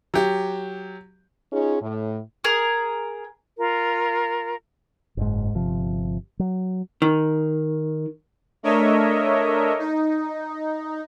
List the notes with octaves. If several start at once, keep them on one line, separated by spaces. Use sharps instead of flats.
F#3 G4
C#4 D#4 F4 G#4 C#5
A2
G#4 A#4
F4 A#4
F#1 G#2
G1 C3 F3
F#3
D#3
A3 D4 A#4 C#5 D#5 E5
D#4